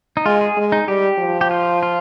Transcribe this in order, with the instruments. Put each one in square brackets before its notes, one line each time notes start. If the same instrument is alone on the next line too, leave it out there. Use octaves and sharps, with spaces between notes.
[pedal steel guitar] D#4
[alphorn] G#3 [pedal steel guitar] F4
[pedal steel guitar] G#4
[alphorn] G#3
[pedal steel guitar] D#4
[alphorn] G3 [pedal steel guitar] G4
[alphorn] F3
[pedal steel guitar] G4
F4
F4